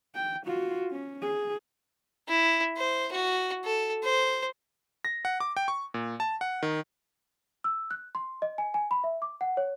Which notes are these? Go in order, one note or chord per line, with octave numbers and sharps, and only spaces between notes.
G5
F4 F#4
C#4
G#4
E4
C5
F#4
A4
C5
A#6
F#5
D6
G5
C#6
A#2
A5
F#5
D#3
E6
F#6
C6
D#5
G#5
G#5
B5
E5
D6
F#5
C#5